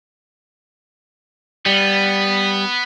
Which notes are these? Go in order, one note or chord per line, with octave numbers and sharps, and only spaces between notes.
G3 B3